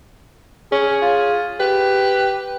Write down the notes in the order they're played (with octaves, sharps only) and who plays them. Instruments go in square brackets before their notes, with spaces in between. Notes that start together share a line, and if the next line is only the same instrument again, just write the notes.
[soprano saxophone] C#4 [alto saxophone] G#4
[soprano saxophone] F4
[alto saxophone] G4 [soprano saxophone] B4